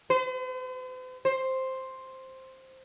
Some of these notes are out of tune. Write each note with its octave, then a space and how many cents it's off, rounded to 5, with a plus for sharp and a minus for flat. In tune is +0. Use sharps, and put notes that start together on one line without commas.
C5 -45
C5 +5